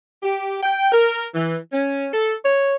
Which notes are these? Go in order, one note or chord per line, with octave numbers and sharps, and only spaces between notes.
G4
G5
A#4
E3
C#4
A4
C#5